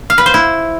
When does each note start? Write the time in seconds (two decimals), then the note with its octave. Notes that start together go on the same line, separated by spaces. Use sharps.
0.10 F5
0.18 B4
0.26 C5
0.34 E4